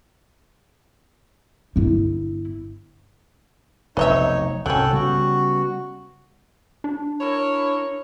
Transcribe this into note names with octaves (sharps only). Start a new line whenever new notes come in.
G1 E4
F1 B1 D#4 B4 C#5 D#5 E5
C2 G#2 F#3 C#4 A4 G5 F#6
C#3 G3 B3 F#4
D4
E4 A#4 C#5